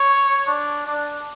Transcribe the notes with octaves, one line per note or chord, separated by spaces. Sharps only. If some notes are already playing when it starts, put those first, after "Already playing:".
Already playing: C#5
D4
D4